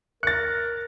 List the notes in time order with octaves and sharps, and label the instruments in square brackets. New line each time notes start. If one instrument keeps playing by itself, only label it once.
[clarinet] A#4 [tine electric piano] F#6 [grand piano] A6 C#7